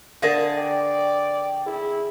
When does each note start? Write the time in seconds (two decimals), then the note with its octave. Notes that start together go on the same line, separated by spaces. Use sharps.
0.22 D3 G#4 A#4 E5 F5 A5
0.57 D5 G5
1.66 E4 G#4